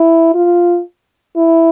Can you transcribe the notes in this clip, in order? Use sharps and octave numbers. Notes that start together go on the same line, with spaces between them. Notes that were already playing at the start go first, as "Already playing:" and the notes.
Already playing: E4
F4
E4